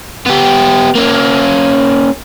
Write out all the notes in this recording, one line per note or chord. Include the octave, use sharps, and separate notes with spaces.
B3 G4
A#3 C#4